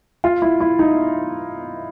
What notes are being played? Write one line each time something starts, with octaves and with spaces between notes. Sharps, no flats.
F4
E4
E4
D#4